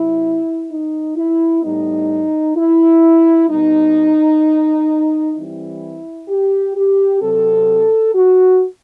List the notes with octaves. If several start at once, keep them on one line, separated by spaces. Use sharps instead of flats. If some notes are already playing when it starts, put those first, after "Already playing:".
Already playing: C3 F#3 C4 E4
D#4
E4
A2 G3 B3 D#4
E4
B2 G3 B3 D#4
E3 G3 C4 E4
G4
G4
C3 F#3 C4 A4
F#4